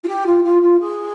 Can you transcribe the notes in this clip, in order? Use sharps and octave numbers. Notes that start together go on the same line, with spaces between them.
F4
G4
F4
F4
F4
G#4